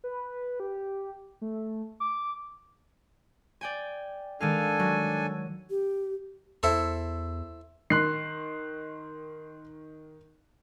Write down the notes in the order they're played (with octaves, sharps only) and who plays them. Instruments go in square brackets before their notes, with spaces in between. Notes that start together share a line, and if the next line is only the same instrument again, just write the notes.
[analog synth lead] B4
G4
A3
D6
[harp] D5 G5 G#5
[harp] D#3 G#3 F5 [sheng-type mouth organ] D4 A4 G#5
[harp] F#3
[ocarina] G4
[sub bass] E2 [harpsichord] E4 A4 C5
[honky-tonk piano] D#3 [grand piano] C6 F#6 C7